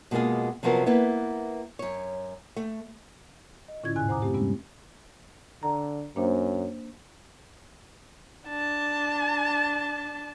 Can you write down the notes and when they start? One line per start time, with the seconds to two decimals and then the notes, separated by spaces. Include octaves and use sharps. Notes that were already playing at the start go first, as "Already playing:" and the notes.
0.11 B2 G#3 A#3 F4 G#4
0.63 C3 F3 F#3 B3 A#4
0.86 A#3 B3 E4 B4
1.79 F#2 C#5
2.56 A3
3.68 D#5
3.84 A2 D3 C#4 E4 F4 G#6
3.96 E2 G#2 C3 G#5 F#6
4.08 C5 F#5 G#5 A#5 D6 D#6
4.22 G2 A3 C4 G4
4.34 C3 G3 G#3 B3 C#4
5.63 D3 A#5
6.16 F#2 A#3 D4 C5
8.48 D4 A5